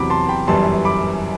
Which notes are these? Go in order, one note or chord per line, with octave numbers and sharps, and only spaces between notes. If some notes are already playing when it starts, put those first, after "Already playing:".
Already playing: E2 C3 F#3 B5 D6
A5 C6
G5 B5
G1 F#2 E3 G3 A5 C6
B5 D6